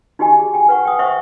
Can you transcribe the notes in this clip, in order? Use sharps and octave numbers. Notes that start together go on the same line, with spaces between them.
D#4 F#4 G4 D#5 G#5
G#4
G5 G#5
B4 F#5 C#6
G5 D#6
C5 E5 F#5 C#6